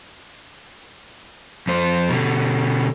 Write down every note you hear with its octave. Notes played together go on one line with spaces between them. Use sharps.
F2 C5
B2 D3